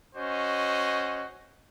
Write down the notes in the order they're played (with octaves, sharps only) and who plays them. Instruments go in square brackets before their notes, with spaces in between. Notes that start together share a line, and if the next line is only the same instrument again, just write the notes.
[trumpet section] C#4 F#4 C5 D#5